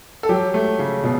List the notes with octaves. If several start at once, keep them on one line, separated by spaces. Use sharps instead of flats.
A4
F#3 G4
A3
C#3
B2